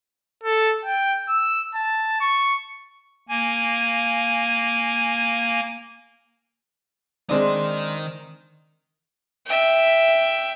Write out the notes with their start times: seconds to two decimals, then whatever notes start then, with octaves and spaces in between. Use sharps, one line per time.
0.43 A4
0.85 G5
1.29 E6
1.75 A5
2.21 C#6
3.29 A#3 G#5
7.29 D#3 G#3 C4 D4 D#4
9.47 E5 G5